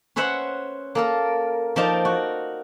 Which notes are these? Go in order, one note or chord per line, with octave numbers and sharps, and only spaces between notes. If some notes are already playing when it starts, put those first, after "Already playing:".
C#4 B4 C5 E5 F#5
A#3 A4 A#4
F3 D#4 A#4 D5 A5
F#4